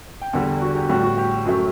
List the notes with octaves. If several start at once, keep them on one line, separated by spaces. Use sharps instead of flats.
G5
E2 D3 G3 F#5
F#4
G4
A2 G3 F#4
F#4
G4
F#2 F#3 A3